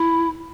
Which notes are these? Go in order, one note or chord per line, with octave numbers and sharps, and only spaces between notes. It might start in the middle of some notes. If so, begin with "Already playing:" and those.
Already playing: E4